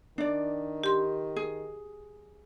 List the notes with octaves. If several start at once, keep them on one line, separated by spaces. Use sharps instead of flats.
D#3 D4 D5
G4 C6
G#4